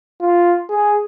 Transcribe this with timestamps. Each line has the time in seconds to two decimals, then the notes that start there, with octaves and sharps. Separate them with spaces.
0.21 F4
0.70 G#4